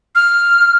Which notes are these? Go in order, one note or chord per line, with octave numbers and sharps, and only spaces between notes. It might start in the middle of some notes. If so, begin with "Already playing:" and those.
F6